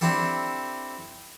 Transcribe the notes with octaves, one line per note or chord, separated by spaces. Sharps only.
C4 D4 E4 G4 A4